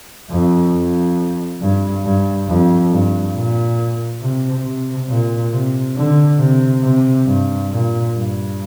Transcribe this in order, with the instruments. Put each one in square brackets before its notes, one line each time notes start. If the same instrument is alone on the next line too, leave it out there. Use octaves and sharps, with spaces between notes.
[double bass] F2
F2
G2
G2
F2
G2
A#2
C3
C3
A#2
C3
D3
C3
C3
G2
A#2
G2